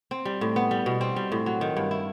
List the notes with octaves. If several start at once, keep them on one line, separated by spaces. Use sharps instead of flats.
C4
G3
A2
B3
G3
B2
C4
G3
A2
F#3
D#3
G2
E4